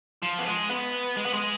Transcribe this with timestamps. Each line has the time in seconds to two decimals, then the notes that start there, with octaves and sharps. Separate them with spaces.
0.22 F3
0.39 B3
0.46 G#3
0.70 B3
1.17 G#3
1.26 B3
1.34 G#3